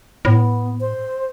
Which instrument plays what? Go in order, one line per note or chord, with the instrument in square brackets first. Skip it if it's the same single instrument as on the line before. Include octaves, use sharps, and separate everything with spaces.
[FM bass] A2 [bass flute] B3
[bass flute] C5